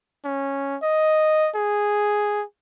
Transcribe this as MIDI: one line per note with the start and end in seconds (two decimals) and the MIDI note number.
0.25 0.77 61
0.83 1.49 75
1.55 2.44 68